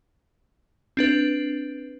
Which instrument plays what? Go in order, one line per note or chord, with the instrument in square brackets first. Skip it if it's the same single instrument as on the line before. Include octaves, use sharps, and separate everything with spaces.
[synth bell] C4 D4 B4